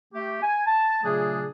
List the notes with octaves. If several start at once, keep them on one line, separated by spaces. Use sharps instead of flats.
A3 G4
G#5
A5
A#2 C#3 F#3 A3 D4 G#4